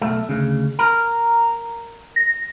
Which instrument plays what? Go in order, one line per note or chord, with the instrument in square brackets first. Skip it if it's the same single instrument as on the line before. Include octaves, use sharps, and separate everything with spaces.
[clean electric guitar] B1 A3
D2 C#3
A#4
[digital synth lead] A#6